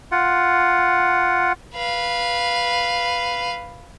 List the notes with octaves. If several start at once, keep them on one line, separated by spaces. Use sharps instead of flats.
F4 F#5
B4 F5